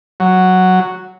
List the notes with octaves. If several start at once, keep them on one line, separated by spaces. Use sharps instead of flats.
F#3